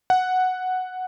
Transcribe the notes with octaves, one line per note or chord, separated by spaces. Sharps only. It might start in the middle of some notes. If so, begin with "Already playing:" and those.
F#5